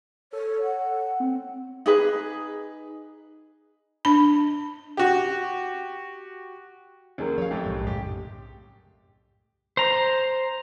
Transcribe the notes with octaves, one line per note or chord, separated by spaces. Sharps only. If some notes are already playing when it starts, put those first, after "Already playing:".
A4 C#5
F#5
C4
D#4 G#4 B4
D4 B5
F#4 G4
D#2 F#3 C#4 G#4 A#4
F3 F#3 C#5 F5
F2 G#2 A3 G4 G5
B1 A2
F#2 A2 C#3 G4
C5 A#5